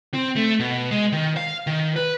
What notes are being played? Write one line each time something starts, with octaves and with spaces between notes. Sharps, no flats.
C4
A3
B2
G#3
D#3
F5
D#3
B4